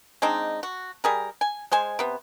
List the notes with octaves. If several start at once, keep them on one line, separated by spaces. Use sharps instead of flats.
G#3 C4 D4 D#4
F#4
G3 G#4 A#4
G#5
G#3 C5 G#5
C3 B3